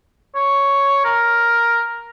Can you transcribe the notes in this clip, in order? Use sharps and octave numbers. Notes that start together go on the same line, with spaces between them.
C#5
A#4